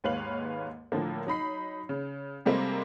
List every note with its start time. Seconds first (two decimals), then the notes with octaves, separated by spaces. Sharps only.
0.04 D#2 G#2 B4 C#5 F5 F#7
0.92 A2 D3 F3 A#3
1.27 F#3 D#4 B5 C7
1.89 C#3
2.46 C3 G3 G#3 A#3 C4 A4